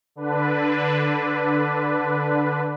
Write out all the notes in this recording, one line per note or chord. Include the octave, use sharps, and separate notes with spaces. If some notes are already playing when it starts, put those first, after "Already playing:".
D3 D4 B4